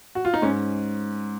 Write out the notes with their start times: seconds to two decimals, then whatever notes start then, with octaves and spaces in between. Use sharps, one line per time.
0.15 F#4
0.25 F4
0.34 D#4
0.42 G#2 C#4